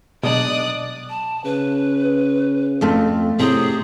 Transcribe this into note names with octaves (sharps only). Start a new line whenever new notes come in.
B2 F#3 G#3 D4 D#4 D5 D#6 F#6
A5
C#3 B4
F2 A3 F4
A2 C3 G#4